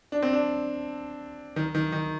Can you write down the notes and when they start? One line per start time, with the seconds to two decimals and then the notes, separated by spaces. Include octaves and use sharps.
0.12 D4
0.23 C4
0.33 D4
1.56 D#3
1.75 D#3
1.92 D#3